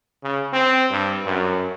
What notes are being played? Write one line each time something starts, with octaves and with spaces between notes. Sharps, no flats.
C#3
C4
G2
F#2